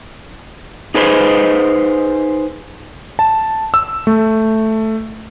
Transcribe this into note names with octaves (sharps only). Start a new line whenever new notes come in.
D#4 G#4 B4 C5 D#5
A5
E6
A3